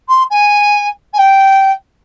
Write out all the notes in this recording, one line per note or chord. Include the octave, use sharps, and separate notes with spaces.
C6
G#5
G#5
G5